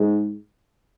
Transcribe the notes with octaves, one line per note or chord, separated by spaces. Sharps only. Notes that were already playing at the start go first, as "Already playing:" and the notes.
Already playing: G#2